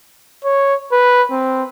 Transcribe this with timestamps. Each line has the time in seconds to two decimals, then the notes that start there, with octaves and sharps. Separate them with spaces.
0.44 C#5
0.92 B4
1.31 C4